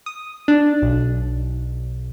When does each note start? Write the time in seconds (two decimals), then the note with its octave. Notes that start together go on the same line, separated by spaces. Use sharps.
0.06 D#6
0.48 D4
0.82 B1